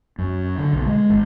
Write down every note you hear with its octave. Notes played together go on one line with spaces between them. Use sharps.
F#2
D3
B1
G#3
G#1